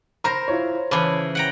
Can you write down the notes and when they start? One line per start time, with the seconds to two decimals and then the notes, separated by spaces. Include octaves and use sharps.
0.24 A#4 C5 A#5 B5 A#6
0.48 E4 F4 C#5
0.91 C#3 E3 A5 B5 D6
1.35 F#5 G5 A#5